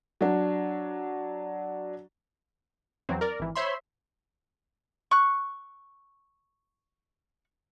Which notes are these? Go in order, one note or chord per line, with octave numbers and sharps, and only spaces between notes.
F#3 D4
E2 E3 F#3 C4
A#4 D5
G#1 E3
C5 C#5 E5 B5 C6
C#6 F#6